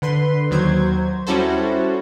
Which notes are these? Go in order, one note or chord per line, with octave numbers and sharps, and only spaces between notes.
D3 B4 C6
D#2 F#3 C5 G#6
G3 C#4 E4 F#4 A4 C5